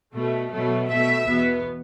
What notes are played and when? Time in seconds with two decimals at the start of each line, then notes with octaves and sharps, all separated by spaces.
0.13 B2 A3
0.50 B2 F#3 A3
0.87 B2 A3 E5
1.24 E2 B2 B3